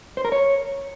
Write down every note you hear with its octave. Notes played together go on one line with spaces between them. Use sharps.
C5
A#4
C#5